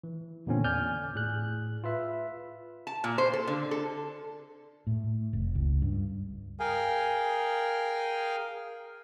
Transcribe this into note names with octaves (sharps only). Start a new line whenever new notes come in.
E3
E2 A#2 D3 C4 C#4
D5 G#5 F6 G6
A2 G#4 F#6
F4 B4 E5
A5
A#2
C5
A4
D3
A4
A2
F1
C#2
G2
G#4 A#4 F5 G5 G#5